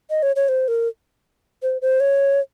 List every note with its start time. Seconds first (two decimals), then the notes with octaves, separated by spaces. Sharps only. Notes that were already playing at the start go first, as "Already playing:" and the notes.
0.10 D#5
0.23 C#5
0.36 C#5
0.48 C5
0.68 A#4
1.63 C5
1.82 C5
2.00 C#5